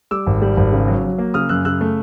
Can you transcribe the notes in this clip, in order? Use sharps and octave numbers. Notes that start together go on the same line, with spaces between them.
G3 D6 E6
G#1
G3
G#1
C#3
F#3
F#3
A#3
C#3 D#6 F6
F#2 E6 F#6
C#3 E6 F#6
A3